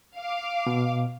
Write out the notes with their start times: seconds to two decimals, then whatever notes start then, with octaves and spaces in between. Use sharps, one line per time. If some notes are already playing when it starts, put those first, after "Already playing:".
0.17 F5 D6
0.67 B2